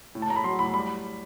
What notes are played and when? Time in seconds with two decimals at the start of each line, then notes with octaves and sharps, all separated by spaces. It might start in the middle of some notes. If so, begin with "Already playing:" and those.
0.15 A2
0.22 A5
0.29 A2 A#5
0.36 B5
0.44 F#3 C6
0.59 A2 B5
0.74 G3 B5